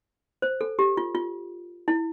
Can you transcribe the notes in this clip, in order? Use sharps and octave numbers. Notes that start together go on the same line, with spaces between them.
C5
A4
G4
F4
F4
E4